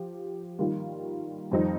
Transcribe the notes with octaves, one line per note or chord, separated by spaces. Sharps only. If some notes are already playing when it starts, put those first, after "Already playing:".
Already playing: F3 G4
D#3 G3 A#3 F4
F2 D#3 G3 C4 D#4